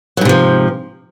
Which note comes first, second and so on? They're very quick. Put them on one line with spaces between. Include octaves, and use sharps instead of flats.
F#3 G#2 C3 F3